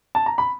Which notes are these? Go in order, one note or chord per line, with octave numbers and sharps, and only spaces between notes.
A5
A#5
B5